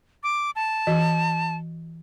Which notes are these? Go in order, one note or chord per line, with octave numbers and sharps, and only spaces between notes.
D6
A5
E3 F#4